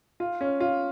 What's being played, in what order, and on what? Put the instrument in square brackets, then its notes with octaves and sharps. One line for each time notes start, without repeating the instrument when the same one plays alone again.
[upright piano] F4
C#4
F4